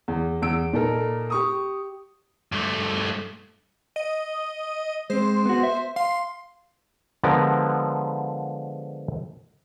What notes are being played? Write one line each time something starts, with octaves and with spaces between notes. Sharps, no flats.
E2
E2 E6 D7
A#2 D#4 A4 A#4
G4 C#6 D#6
G2 A3
D#5
G#3 C4 C5
B3 F#4
E5
F5 C6
D3 F3 G#3 B3 G4 A#4